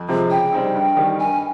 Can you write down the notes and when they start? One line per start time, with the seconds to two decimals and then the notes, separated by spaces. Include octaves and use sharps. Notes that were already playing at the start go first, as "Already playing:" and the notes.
Already playing: F2
0.08 C3 F3 G#3 C4
0.30 C#3 G5
0.53 G3 C4 D#4
0.75 G2
0.97 D#3 G3
1.18 G2 G#5